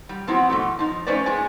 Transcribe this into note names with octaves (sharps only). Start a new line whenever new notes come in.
G3
F3 B3 C4 E4 F#4
G#2 B2 A3
F3 D#4
A3 C#4 D#4 B4 C5 D5
A#2 G#3 G#5